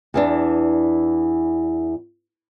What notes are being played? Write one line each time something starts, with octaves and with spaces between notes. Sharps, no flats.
E2 E3 D4